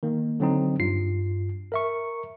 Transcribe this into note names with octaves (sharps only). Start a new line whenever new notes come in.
D#3 A#3
D3 F#3 C4 D#4
G2 F4 C7
A#4 E5 C#6